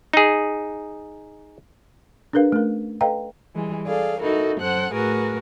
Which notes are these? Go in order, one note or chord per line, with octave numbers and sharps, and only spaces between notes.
D#4 G#4
D4 G#4 A#4 B4 F5
A3 C#4 A#4
A4 B4 D#5 F5 G5 A#5
E3 G3 G#3
G#4 A4 D5 F5
D#4 E4 F#4 A4 A#4
F#2 A4 C5 F#5 F#6
A2 F#4 G#4 A#4 B4